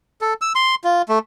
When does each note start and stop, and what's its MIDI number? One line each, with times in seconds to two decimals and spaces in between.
0.21 0.34 69
0.41 0.53 88
0.55 0.75 84
0.84 1.02 65
1.09 1.19 57